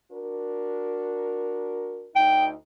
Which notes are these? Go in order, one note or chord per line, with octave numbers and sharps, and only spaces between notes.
D4 F#4 A#4
D2 D#4 G5